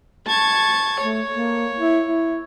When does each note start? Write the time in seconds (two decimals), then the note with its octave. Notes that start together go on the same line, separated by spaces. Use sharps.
0.27 A5 C#6 G#6
1.01 A3 C#5
1.32 A#3
1.77 E4
2.07 E4